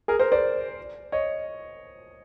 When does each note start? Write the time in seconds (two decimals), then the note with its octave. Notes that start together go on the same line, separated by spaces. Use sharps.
0.08 G#4 A#4
0.19 A#4 C5
0.32 C5 D5
1.12 C#5 D#5